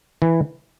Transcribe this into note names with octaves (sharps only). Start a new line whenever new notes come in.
E3